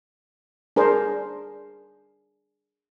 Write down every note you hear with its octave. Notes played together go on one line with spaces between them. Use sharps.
D4 G#4 A#4 C5